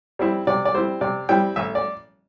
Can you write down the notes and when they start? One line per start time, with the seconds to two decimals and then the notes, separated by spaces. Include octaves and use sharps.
0.19 G3 C4 E4
0.47 C3 D5
0.65 D5
0.74 G3 C4 E4 C5
1.01 C3 D5
1.29 G3 C4 E4 G5
1.56 A1 E5
1.75 D5